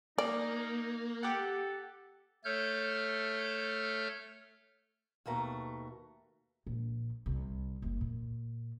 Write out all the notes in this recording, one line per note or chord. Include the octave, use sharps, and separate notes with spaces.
A#3 D#4 D5
G4 A4 F#5
A3 A4 C#5 F6 G6
D#2 B2 A3 A#5
A#1
C2
F#1
A#2